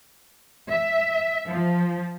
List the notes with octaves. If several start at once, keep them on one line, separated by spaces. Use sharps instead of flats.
E5
F3